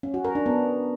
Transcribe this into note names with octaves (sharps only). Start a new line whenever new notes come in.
C#4
F#4
A#4
D4
B3